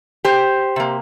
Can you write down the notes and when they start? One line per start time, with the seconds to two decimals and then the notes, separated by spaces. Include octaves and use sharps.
0.25 G4 C5
0.76 C3 A#3